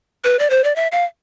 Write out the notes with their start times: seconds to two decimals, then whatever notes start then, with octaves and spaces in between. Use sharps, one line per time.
0.24 B4
0.39 D5
0.50 C5
0.64 D5
0.76 E5
0.92 F5